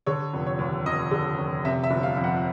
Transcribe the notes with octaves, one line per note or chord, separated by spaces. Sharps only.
D3 C#5
F1
C#5
D#2
F1 D#5
D3
F1
C3 E5
E5
G1
F5
F2
F#5